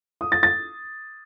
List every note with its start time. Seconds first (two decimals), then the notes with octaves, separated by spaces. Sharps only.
0.21 D#6
0.32 A6
0.43 A6